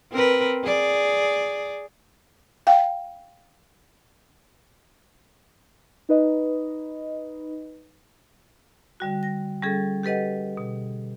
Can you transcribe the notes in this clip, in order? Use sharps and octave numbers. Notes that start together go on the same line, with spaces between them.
C4 A#4 B4
G#4 D5
F5 G5
D#4 B4 D#5
D3 G3 F#4
A#6
G3 C#4 G#4 A4
G4 A4 B4 D#5 F#5
B2